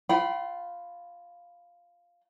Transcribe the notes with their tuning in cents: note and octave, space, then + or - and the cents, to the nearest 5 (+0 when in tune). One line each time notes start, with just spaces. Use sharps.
F4 +0 G5 -40 B5 +0